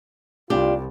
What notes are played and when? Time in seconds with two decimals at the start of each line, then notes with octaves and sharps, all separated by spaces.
0.50 C2 D4 F4 G4